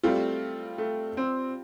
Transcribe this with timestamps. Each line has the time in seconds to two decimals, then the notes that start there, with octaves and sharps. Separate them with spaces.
0.03 G3 A3 C4 F4
0.78 A3
1.17 C4